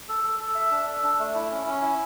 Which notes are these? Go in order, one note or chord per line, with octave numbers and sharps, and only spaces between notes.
A4
A4
A4
E5
D4
A4
D4
A3
E4
C#4
C#4
E4